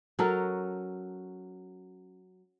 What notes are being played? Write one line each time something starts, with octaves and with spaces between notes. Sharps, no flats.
F#3 C#4 A4 A#4